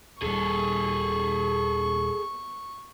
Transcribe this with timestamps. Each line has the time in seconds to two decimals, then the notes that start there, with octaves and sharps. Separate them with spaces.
0.22 D#1 G3 G#4 A4 C#6